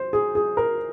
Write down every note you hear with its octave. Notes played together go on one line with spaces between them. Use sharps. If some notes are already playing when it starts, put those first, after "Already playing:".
Already playing: C5
G#4
G#4
A#4